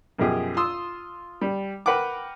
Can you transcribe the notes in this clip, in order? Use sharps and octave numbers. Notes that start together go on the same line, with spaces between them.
F#2 B2 F3 G4 G#4
F4 C6 D#6 E6
G3
A#4 B4 F#5 G5 D6